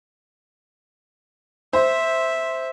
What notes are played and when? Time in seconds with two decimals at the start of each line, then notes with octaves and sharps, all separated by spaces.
1.73 C5 E5